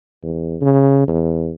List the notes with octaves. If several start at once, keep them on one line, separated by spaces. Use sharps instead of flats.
E2
C#3
E2